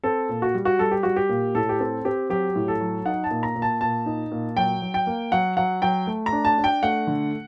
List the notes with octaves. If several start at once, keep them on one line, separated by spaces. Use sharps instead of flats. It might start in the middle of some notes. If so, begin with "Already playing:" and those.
C4 A4
A#2
F#4
G3
F#4
G3 A4
G4
G3 F#4
G4
A#2
A2 A4
G4
C4 A4
C4 G4
F#3 G4
A2
A4
F#3
D#4 F#5
A5
A#2
A#5
A#2
A5
A#2 A5
D#4
A#2
F#3 G5
F#3
G5
A#3
F#3 F#5
F#3 F#5
F#3 G5
A3
A#5
D4
A5
D4
G5
A3 F#5
D3